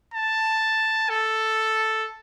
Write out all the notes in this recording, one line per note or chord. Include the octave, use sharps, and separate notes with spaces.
A5
A4